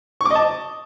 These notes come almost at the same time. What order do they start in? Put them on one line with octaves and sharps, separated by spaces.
C#6 D6 D#5 A5